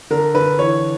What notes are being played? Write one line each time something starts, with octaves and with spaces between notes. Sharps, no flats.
D3 A#4
D3 B4
E3 C#5